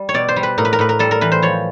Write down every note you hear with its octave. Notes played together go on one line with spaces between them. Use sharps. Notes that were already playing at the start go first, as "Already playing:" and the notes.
Already playing: G3
C#5
B2 D5
C5
G3
B4
A2 A#4
B4
A#4
A2 B4
A#4
G3 A4
A#4
E3 B4
C5
F3 C#5